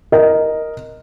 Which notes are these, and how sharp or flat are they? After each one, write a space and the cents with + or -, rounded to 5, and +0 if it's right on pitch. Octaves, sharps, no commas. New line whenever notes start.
A#4 +0 D#5 +0